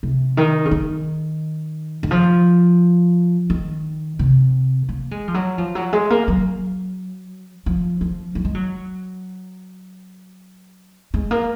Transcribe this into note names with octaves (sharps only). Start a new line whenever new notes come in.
C3
D#3
C#3
D#3
D#3
F3
D#3
C3
A#3
G#3
F3
F#3
F3
F#3
G#3
A#3
F#3
F3
F3
F#3
G#3
F#3
G#3
A#3